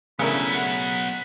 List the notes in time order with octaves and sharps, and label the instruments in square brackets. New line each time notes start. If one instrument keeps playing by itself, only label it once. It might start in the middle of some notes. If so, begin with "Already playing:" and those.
[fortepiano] C#3 A3 A#4 [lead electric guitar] F#3 B3 [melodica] E4 E5 [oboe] B5
[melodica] F#5